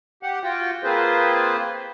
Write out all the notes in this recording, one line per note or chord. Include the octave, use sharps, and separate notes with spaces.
G4 F#5
F4 F#4 G5
A#3 C4 F4 G#4 B4 C5